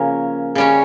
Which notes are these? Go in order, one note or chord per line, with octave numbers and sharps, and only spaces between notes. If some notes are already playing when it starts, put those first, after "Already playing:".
Already playing: C#3 F3 A#3 C#4
C#3 G3 C#4